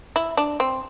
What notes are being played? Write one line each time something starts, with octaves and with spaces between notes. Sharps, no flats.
E4
D4
C4